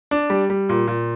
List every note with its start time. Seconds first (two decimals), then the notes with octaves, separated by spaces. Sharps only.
0.11 D4
0.30 G3
0.50 G3
0.69 A#2
0.88 A#2